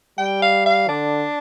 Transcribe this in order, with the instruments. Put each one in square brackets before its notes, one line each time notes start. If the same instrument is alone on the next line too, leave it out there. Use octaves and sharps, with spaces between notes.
[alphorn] G3 [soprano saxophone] G5
[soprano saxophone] F5
F5
[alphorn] D3 [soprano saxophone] D4